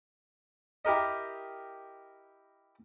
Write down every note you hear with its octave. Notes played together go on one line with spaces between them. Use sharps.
E4 G4 A#4 D#5